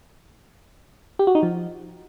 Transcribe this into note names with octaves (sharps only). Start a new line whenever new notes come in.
G4
F#4
D#4
F3